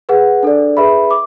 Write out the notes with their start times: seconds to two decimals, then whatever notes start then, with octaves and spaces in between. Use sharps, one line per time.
0.09 G#4 B4 F#5
0.43 D4 A4 D5
0.77 G#4 B4 E5 B5
1.11 D6